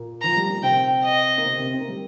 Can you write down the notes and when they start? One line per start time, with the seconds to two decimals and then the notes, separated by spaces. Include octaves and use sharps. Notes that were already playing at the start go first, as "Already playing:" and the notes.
Already playing: A#2 A#3
0.21 F3 A#5
0.37 G3
0.50 A#3
0.63 C3 C4 G5
1.04 D#5
1.38 A#3
1.45 C3 C4
1.59 C3 C4
1.73 C4
1.80 A#3
1.88 G3